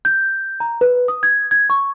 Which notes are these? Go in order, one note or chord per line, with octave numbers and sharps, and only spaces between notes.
G6
A#5
B4
D#6
G#6
G#6
C#6